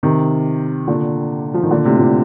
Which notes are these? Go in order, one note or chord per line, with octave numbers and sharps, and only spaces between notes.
C3 D#3
A#2 D3
F3
D#3
A#2 D3
A2 C3
A#2